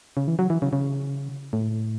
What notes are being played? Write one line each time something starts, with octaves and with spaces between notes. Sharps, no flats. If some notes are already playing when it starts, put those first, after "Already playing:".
C#3
E3
F#3
E3
C#3
C#3
A2